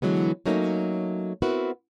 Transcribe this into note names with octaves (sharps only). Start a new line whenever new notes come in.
D3 E3 F#3 G#3 B3
F#3 A3 A#3 C#4 D#4
B3 C4 E4 F#4 A#4 B4